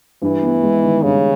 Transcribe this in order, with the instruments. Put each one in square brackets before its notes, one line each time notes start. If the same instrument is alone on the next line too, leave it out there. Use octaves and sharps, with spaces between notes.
[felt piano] G2 [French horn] E3
[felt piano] B3
G#3
D#3
[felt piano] G2 [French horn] C#3